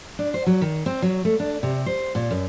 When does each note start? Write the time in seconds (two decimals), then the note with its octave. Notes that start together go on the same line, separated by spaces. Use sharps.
0.19 D4
0.34 C5
0.46 F#3
0.61 D#3
0.86 C4
1.02 F#3
1.25 A3
1.40 D4
1.63 C3
1.86 C5
2.15 A#2
2.31 F#2